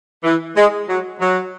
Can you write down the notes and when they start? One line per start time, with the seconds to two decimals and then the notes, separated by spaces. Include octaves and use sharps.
0.24 E3
0.56 G#3
0.88 F#3
1.20 F#3